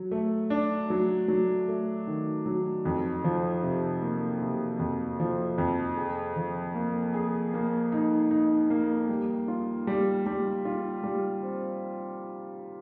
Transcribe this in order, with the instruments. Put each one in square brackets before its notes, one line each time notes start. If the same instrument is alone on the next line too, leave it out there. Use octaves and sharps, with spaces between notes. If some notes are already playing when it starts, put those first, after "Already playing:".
Already playing: [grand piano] F#3
A3
D4
F#3
F#3
A3
D#3
F#3
F2
F3
C3
A#3
C3
F2
F3
F2
G#4
F3
A#3
G#4
A#3
D#4
D#4
A#3
G3
F4
G3
G3
F4
G3
C4